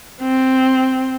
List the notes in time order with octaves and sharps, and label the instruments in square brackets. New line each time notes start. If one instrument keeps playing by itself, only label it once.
[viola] C4